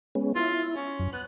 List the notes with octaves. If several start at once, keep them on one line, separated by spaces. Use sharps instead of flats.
G#3 B3 C#4
E4 F4
C#4
F#2
B3 F#6